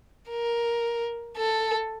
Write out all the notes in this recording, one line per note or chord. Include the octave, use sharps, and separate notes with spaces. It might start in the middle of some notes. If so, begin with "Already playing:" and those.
A#4
A4